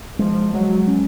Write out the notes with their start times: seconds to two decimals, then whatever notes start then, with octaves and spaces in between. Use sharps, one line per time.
0.19 F3 G#3
0.53 F#3 G#3
0.87 C#4